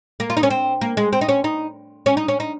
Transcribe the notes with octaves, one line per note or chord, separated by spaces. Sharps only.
A#3
F4
D#4
C#4
C4
A#3
G#3
C4
D#4
C#4
D#4
C#4
D#4
C#4
D#4